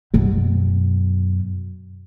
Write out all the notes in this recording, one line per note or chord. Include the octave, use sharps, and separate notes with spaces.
F#2 B2